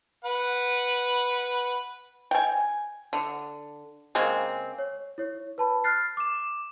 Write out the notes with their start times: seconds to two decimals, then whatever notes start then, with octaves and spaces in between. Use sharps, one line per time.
0.25 B4 F#5
2.31 G5 G#5
3.13 D3
4.15 C#3 G#3 A#3 C4
4.78 C#5
5.18 E4 C#5
5.58 B4 A5 B5
5.84 F6 F#6 A6 C7
6.17 D6 E7